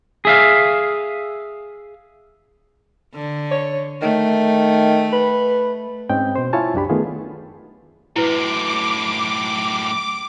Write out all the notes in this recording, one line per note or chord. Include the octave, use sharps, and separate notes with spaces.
G#4 E5 F5
D3
C#5
D#3 A3
B4
G#2 C4 C#4 D#5 G5 G6
B2 C5
E4 F4 C#5 G#5 A5
C2 F#2 D4 G4 B5
D#3 A3 B3 F4 G#4
F#2 A2 E4 B4 D6